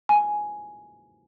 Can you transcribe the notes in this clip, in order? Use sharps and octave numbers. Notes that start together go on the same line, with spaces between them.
G#5